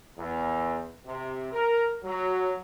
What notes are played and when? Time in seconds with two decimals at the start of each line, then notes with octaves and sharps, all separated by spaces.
0.18 E2
1.05 C3
1.52 A#4
2.03 F#3